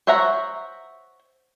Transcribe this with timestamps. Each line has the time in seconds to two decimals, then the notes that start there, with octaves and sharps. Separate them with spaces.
0.07 C5 C#5 E5 F#5 A#5